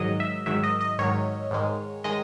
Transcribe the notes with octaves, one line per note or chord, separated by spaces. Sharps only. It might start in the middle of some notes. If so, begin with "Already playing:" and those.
Already playing: G#2 D#3 F#3 D#5
E5
G#2 D#3 F#3 E5
D#5
D#5
G#2 D#3 F#3 C#5
G#2 D#3 G#3
D#3 G#3 D#5